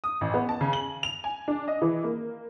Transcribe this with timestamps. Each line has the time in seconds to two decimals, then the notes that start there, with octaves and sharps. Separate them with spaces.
0.04 D#6
0.21 A1
0.34 B3
0.49 A5
0.61 C#3
0.73 F#7
1.03 F7
1.24 G#5
1.48 D4
1.68 D#5
1.82 E3
2.04 A#3